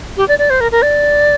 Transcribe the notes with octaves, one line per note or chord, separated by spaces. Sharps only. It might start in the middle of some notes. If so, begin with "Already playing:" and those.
G4
D5
D5
C5
A#4
A#4
D5